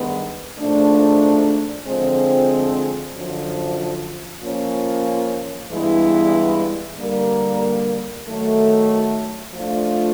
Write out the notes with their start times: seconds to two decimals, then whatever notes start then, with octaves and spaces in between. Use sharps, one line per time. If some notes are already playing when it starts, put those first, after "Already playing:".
Already playing: G2 D#3 G#3 B3
0.59 G#2 F3 A3 D4
1.86 D3 F3 G#3 C4
3.15 F#2 D3 F3
4.43 F3 A#3 C#4 F4
5.70 G2 E3 G#3 B3 E4
6.99 D3 G3 A#3
8.27 D#3 F#3 A3
9.54 F3 A3 D4 F4